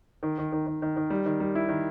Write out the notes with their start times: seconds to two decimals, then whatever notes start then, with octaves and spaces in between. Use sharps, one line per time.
0.23 D#3
0.38 D#3
0.52 D#3
0.67 D#3
0.82 D#3
0.97 D#3
1.10 G3
1.26 D#3
1.40 G3
1.55 E4
1.69 D#3